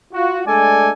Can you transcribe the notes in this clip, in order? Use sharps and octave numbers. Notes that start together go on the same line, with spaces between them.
F4 F#4
G#3 A3 D4 A4 D5 G#5